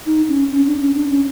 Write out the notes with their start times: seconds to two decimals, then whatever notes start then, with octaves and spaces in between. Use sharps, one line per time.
0.06 D#4
0.28 C#4
0.51 C#4
0.66 D4
0.80 C#4
0.95 D4
1.10 C#4